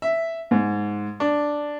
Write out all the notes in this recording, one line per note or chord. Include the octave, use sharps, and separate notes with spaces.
E5
G#2
D4